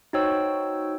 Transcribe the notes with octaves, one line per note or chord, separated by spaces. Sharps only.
D#4 F#4 C5 C#5 G5 E6